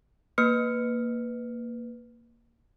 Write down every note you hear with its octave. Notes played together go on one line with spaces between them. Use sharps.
A#3 B4 F6 C#7